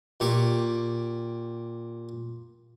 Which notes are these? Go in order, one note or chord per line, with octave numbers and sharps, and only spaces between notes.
A#2 G4 C#6 D6